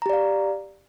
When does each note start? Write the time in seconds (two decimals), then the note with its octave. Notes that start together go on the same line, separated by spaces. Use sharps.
0.02 A#5
0.06 G4
0.09 D5
0.13 F5